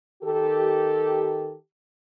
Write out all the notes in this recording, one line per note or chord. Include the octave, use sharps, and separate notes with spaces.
D#3 G4 A4